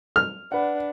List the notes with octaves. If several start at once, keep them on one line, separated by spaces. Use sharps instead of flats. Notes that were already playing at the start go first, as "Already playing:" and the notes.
F6
D4 B4 F#5